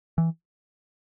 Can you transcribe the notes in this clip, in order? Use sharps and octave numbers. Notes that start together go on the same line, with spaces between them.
E3